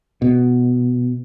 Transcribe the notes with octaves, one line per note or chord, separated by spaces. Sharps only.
B2